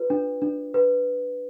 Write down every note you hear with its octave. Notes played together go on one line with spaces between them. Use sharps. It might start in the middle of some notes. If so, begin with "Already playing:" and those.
Already playing: F4 B4
D4
D4
B4